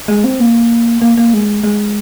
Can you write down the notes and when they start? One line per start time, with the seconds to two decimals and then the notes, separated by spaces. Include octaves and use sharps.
0.08 G#3
0.24 C4
0.40 A#3
1.02 A#3
1.17 A#3
1.33 G#3
1.64 G#3